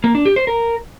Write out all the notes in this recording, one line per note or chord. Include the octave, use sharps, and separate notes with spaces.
A#3
D4
G4
C5
A#4